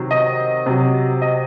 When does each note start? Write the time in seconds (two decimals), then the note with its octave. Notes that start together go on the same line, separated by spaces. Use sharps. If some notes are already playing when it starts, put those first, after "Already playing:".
Already playing: C3 D#3 F#3
0.11 D#5
0.66 C3 F#3
1.22 D#5